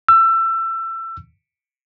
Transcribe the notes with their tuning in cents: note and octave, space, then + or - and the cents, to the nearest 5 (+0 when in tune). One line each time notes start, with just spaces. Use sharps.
E6 +25